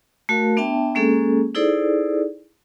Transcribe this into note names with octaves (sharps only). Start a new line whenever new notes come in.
A3 F#4 A#4 F5 A5
B3 D4 E5 G5 A5
G#3 A#3 C#4 G#4 A4
D#4 E4 G#4 A4 C5 D5